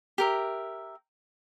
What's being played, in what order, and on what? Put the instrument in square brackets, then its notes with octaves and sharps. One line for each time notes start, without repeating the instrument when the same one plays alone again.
[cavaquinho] G4 A#4 E5